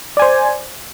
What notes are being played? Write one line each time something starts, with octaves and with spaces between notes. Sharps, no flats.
C5 D5 G#5